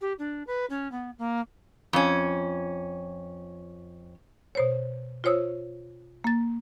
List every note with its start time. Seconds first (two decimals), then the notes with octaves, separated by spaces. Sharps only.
0.01 G4
0.19 D4
0.47 B4
0.70 C#4
0.91 B3
1.18 A#3
1.93 F2 C#4
4.55 B2 C5 C#5
5.24 F4 C5 C#5 D#6 E6
6.24 A#3 A6